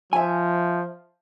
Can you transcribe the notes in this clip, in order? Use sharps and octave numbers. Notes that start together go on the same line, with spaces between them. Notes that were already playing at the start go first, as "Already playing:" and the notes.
F3 E5 G#5